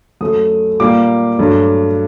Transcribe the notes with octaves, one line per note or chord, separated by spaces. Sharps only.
F#2 F#3 A3 D#6
A#2 G3 A#3 D6
G2 F#3 A3